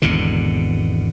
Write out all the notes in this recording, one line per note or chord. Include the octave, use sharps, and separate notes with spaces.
G#1 E2 B2 D3